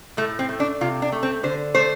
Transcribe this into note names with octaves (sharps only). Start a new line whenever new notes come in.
A2 A3
C4
A3
D4
C3 F4
D4
A3
C4
D3 C5
A3 C5